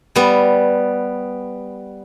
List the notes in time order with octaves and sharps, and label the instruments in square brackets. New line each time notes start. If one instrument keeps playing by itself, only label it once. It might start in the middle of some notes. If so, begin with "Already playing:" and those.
[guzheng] G3 B3